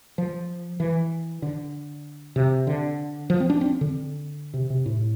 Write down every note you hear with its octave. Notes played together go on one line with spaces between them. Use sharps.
F3
E3
D3
C3
D3
F3
C4
D4
C4
D3
C3
C3
A2